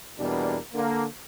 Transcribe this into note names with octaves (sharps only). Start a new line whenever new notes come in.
E2 B2 G3 A#3 D4
D3 A#3